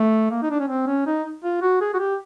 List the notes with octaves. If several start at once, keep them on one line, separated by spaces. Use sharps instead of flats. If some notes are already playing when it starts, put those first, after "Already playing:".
Already playing: A3
A#3
D#4
D4
C#4
C4
C#4
D#4
F4
F#4
G#4
F#4
G4